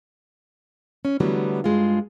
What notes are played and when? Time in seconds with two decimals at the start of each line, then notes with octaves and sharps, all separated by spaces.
1.05 C#4
1.20 D3 E3 F#3 G3 A3 B3
1.64 G2 G#3 F4